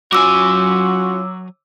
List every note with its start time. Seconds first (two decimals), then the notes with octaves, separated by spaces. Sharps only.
0.13 F#3 C#4 F4 F#4 G#5 D6 E6